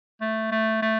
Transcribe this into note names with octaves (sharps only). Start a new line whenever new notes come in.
A3
A3
A3